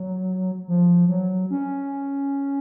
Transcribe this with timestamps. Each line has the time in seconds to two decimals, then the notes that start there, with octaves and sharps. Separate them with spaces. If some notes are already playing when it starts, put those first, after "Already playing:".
Already playing: F#3
0.68 F3
1.09 F#3
1.51 C#4